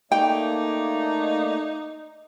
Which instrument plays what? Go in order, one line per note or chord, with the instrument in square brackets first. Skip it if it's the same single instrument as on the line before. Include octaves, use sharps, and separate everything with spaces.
[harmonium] A3 A#3 D5 [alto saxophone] D#4 [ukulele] G5